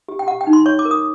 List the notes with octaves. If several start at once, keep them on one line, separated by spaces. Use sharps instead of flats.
G4
G5
G4 F#5
G5
D#4
C6
C#5 C#6
D6
A#4
D#6